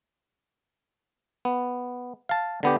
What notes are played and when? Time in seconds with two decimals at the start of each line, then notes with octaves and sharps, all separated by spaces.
1.45 B3
2.29 F5 A5
2.63 D3 B3 G4